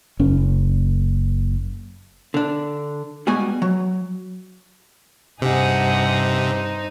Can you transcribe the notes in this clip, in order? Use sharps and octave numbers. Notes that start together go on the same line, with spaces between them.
F#1 C#4
D3 D4
G3 G#3 B3 F#4 G#5
F#3
G2 C3 D#4 G#4 C5 F#5